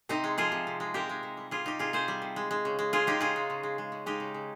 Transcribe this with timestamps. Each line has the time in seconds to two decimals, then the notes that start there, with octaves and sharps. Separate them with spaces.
0.09 C3 C4 D#4
0.24 G#3
0.38 F3 F4 G#4
0.52 C3
0.67 C3
0.80 G#3
0.94 C3 G4 A#4
1.09 G#3
1.23 C3
1.37 G3
1.51 G3 F4 G#4
1.64 C3 D#4 G4
1.79 C3 F4 G#4
1.93 C3 G#4 C5
2.08 G3
2.22 C3
2.36 G#3
2.51 G#3
2.65 C#3
2.79 G#3
2.93 G#3 F4 G#4
3.07 G#3 D#4 G4
3.21 C#3 F4 G#4
3.36 G#3
3.50 C#3
3.63 G#3
3.78 G#3
3.92 C#3
4.06 G#3 D#4 G4
4.20 C#3
4.34 C#3